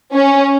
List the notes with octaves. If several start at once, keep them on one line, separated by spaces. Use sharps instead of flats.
C#4